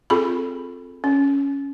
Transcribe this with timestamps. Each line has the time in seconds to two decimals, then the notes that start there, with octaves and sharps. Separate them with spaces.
0.10 C4 F4 G#4 A4 B5
1.04 C#4